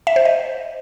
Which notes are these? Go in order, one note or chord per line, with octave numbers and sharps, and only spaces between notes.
E5
C5
D#5